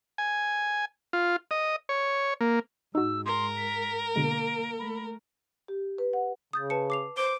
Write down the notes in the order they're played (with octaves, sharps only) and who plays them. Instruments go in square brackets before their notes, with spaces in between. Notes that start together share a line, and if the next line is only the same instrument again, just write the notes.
[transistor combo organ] G#5
F4
D#5
C#5
A#3
[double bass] G#2 [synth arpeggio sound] D#4 F#4 [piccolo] E6
[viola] A#4 [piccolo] C6
[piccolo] B6
[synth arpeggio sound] B2 D3 G#3 [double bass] A#3 [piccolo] D7
[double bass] A3 [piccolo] B5
[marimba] G4
B4
F#5
[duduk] C#3 [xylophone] D#6 G6 A6
[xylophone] B4 A5 C#7
D6 C7 F7
[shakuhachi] C5 [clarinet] D6 [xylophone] G7